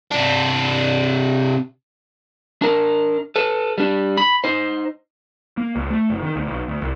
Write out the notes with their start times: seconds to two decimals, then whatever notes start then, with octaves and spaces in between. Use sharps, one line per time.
0.11 C3 D4
2.62 D4 A#4
3.36 A4 B4
3.78 G3 D4
4.17 B5
4.44 D#4 C5
5.57 A#3
5.76 C#2
5.90 A3
6.10 F#1
6.22 D#3
6.36 D2
6.47 B1
6.68 D2
6.82 C2